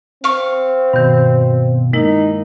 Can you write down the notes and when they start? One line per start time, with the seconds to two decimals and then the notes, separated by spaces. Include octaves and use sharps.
0.24 C4 F5 C#6
0.93 G2 B2 D#3
1.93 G#3 A#3 D#4 E4